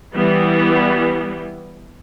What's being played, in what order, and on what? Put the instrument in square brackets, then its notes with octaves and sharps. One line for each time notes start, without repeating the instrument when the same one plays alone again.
[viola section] E3 G3 B3